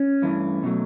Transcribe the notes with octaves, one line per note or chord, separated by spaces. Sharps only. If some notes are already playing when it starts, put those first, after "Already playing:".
Already playing: C#4
G2 E3 A3
B2 F#3 A3